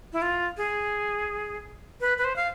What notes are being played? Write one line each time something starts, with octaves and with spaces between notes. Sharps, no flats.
E4
F4
G#4
B4
B4
C5
F5